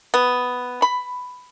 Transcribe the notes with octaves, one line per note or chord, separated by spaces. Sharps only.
B3
B5